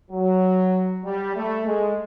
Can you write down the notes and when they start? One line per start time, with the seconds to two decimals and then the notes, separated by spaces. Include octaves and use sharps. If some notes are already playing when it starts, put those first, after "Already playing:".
0.11 F#3
1.04 G3
1.36 A3
1.67 G#3